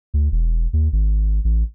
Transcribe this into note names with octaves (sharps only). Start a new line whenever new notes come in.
D2
E1
D#2
G#1
A1